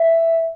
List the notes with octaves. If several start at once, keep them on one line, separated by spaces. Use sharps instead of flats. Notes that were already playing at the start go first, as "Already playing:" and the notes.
Already playing: E5